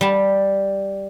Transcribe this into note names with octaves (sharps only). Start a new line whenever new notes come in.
G3 A5